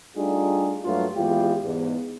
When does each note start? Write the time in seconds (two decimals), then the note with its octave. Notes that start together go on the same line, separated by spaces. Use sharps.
0.16 G3 A3 D4 D#4 F4 G#4
0.85 G2 F#3 A3 A#3 F4
1.14 G#1 E2 G#3 F4 G4
1.64 E2 G#2